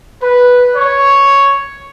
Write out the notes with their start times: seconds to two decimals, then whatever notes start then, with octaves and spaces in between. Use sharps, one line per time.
0.21 B4
0.76 C#5